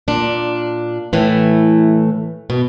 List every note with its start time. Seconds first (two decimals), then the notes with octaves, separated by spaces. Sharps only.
0.08 A#2 D4
1.13 A2 E3 A3
2.50 B2